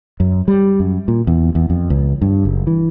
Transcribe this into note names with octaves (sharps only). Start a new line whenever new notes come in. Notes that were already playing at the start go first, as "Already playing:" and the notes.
F#2
G3
F#2
A#2
E2
E2
F2
C#2
G2
F#1
E3